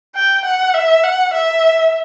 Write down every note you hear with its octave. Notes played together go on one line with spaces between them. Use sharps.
G5
F#5
E5
F#5
E5